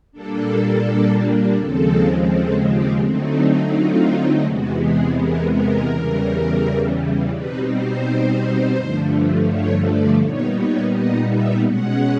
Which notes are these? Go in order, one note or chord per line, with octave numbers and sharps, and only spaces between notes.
A#2 G3 A#3 D4 A4
D#2 C#3 F3 G#3 C4 A4
A4
G4
D3 F#3 A3 C4 D#4
F4
E2 C3 E3 G#3 B3 F#4
G#4
A#4
A#4
E2 C#3 E3 G3
B2 G3 C4 D#4 B4
C5
G2 D3 F3 A3
C#5
D5
A#2 G3 B3 D#4 C#5
C#5
D#5
E5
B2 G#3 C#4 F#5